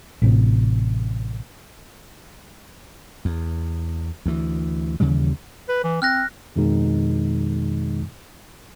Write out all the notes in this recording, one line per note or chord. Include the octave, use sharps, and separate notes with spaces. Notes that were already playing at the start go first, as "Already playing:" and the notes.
A1 A2 C3
E2
D2 E3
D#2 C#3 E3 G3
B4
E3
C4 F6 F#6 A#6
F2 B2 D#3 G#3 D#4